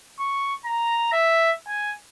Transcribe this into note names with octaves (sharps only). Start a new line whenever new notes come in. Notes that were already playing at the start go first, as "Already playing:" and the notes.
C#6
A#5
E5
G#5